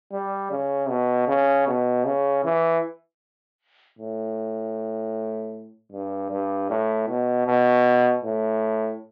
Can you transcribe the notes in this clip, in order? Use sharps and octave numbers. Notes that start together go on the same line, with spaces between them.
G3
C#3
B2
C#3
B2
C#3
E3
A2
G2
G2
A2
B2
B2
A2